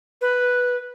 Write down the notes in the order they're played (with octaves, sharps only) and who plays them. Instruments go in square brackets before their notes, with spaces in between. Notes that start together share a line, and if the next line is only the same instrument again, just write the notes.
[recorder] B4